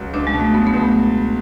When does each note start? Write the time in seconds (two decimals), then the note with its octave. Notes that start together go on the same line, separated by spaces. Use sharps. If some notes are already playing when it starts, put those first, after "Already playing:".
Already playing: C#2 F#3
0.14 C#2 D4
0.27 G#3
0.33 B2
0.40 A3
0.54 F#3 B3
0.67 B3
0.73 C#2
0.80 A3